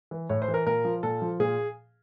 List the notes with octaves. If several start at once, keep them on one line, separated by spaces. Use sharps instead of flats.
E3
A2 C#5
C5
E3
A#4
A#2 A#4
F3
A#2 A4
F3
A#2 G#4